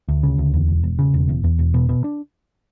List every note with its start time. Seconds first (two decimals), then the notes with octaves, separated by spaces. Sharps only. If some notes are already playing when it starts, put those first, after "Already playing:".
0.08 D2
0.23 C#3
0.38 D2
0.54 E2
0.68 E1
0.83 E1
0.99 C#3
1.14 E1
1.29 E2
1.44 E2
1.59 E1
1.74 B2
1.89 B2
2.04 D4